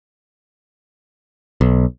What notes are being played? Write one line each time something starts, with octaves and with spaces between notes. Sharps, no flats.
B1